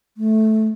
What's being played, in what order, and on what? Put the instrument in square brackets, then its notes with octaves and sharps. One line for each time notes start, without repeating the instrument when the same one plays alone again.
[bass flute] A3